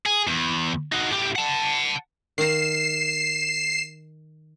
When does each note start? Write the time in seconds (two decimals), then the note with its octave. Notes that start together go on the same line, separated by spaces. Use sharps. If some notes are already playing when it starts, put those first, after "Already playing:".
0.06 G#4
0.27 E2
0.92 D#4 F#4
1.11 A2 G4
1.36 F#5 A5
2.38 D#3 F5 A#5 C7 E7